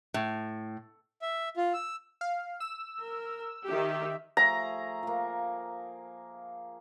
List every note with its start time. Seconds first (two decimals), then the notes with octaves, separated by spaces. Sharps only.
0.14 A2
1.22 E5
1.57 F4
1.74 E6
2.21 F5
2.60 E6
3.00 A#4
3.68 D#3 G4 E5
4.37 F3 A3 G#4 A#5
5.03 F3 A#3